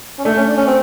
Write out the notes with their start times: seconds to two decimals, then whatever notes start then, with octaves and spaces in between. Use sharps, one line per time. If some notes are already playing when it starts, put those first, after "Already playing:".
0.19 C#4
0.24 A3 D4
0.37 C#4
0.48 D4
0.57 C#4
0.67 C4